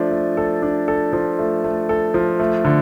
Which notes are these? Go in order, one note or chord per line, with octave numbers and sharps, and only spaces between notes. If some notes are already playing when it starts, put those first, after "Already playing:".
Already playing: F3 A3 D4
A3
A4
D4
A4
F3
A3
A3
A4
F3
A3
D3